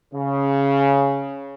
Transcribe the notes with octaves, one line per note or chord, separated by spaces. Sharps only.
C#3